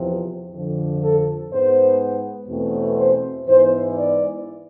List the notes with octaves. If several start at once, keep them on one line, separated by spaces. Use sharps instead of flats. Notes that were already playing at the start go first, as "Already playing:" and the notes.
Already playing: E2 C3 F3
F2 D3 F3
A4
G#2 G#3 B3 C5
E2 B2 A3 C4
C5
G#2 E3 B3 C5
D5